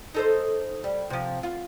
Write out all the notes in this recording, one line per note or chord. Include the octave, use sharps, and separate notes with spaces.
D#4 A4 C5
G3
C3 F3
F4